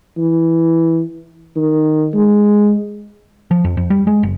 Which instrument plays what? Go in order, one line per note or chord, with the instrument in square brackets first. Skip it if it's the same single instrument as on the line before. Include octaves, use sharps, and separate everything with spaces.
[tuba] E3
D#3
G#3
[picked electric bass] F3
F2
F2
G3
G#3
F#1